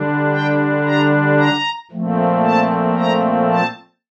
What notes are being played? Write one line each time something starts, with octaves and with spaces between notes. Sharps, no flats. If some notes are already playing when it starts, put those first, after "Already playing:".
Already playing: D3 G3 D4
G5
A#5
A#5
A#2 F3 A3 C4
A5
A#5
A5